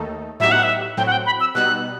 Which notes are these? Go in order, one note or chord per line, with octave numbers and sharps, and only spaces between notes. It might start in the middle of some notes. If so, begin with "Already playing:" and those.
Already playing: D#2 D#3 A3 D#4 A4
A2 F#3 B3 D#4 G4 E5
F#5
E5
A2 F#3 C4 G5
F#5
G5
B5
E6
B2 G3 B3 D#4 F#6